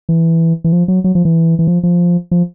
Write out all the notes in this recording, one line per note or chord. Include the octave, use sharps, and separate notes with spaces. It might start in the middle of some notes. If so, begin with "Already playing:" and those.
E3
E3
F3
F#3
F#3
F3
E3
E3
F3
F3
F3